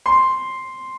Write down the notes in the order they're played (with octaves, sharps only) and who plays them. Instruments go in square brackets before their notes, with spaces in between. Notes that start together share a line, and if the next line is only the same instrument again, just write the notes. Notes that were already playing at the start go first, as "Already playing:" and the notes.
[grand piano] C6